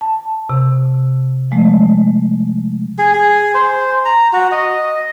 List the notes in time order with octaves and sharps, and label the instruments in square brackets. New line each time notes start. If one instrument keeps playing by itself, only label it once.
[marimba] A5
C3
F3 G#3 A3
[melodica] G#4
G#4
C5
A#5
F#4
D#5